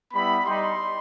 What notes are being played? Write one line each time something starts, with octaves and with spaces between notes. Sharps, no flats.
G3 B3 E4 B5
G3 D#4 G4 C6